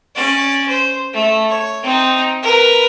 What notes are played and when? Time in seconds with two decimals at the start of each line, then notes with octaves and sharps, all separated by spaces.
0.16 C#4 D5
0.68 C5
1.14 A3
1.48 C#5
1.83 C4 D#4
2.42 A#4 B4